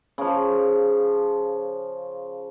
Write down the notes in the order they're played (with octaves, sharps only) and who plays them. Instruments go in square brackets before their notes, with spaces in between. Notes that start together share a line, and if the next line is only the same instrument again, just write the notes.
[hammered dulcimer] C#3 F3